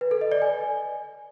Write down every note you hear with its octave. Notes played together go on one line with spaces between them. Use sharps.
B4
A4
D#5
D5
G#5